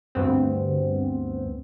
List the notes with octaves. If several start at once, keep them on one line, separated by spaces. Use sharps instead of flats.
D2 G2 B3 C4